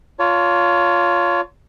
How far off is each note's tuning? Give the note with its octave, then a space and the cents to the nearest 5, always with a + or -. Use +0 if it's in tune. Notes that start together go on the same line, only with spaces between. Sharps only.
F4 +0 C#5 +25 A5 +25